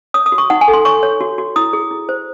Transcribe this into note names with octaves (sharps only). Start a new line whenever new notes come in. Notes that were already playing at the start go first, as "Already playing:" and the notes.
C#5 D#6
D#6
F#4
C#6
D#4 F#5
G#5
A4
C6
C#5 C#6
C#5
F#4
F#4
E4 D#6
G#4
E4
C5